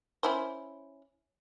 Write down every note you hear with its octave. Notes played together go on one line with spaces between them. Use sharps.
C#4 E4 C5